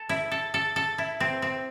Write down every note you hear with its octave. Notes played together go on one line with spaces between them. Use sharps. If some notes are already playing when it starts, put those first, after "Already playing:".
Already playing: A4
E4
A4
A4
A4
E4
C4
C4